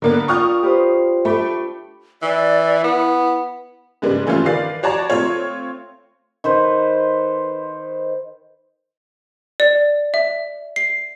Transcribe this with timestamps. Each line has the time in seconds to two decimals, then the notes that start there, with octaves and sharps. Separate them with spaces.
0.02 D3 A#3 B3 A#4
0.28 D4 F4 G5 C#6 D#6 F6
0.63 G4 B4 C5
1.25 A3 B5 D6
2.22 E3 D5
2.84 B3 E4
4.02 G#2 C#3 G3 A#3 B3 D4
4.26 G2 E3 A3 C4 C#4 F4
4.45 D#3 B4 D5 F5 A6 C7
4.83 F#4 C#5 D5 A5 A#5
5.10 A3 C4 F4 C#5
6.44 D#3 B4 C5
9.60 D5
10.14 E5
10.76 C7